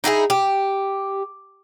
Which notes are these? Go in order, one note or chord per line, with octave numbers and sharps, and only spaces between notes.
D#4 E4 G4 G#4
G4